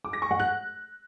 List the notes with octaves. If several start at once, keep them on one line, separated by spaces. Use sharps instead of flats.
D6
A#6
C#6
F#5
F#6